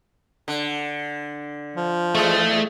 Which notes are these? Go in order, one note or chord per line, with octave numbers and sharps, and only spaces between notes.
D3
F3
E2 G#3 A3